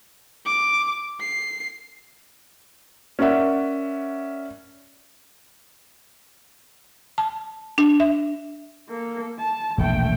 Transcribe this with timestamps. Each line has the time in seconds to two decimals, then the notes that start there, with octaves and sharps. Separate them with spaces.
0.46 D6
1.21 C7
3.19 C#4 A#4 D5 E5 F#5
7.18 A5
7.78 D4
8.00 E5
8.90 A#3 A4
9.39 A5
9.78 E1 A#1 A3 G5